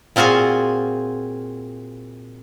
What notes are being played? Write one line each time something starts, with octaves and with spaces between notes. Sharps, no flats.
A#2 C4 F4 F#4 G#4 G#5